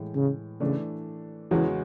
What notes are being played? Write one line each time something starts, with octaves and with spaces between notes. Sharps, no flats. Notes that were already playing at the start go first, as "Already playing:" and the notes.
Already playing: A2 E3 G#3
C#3
C#3 E3 A3 D4
E2 C#3 E3 G#3 C#4 F#4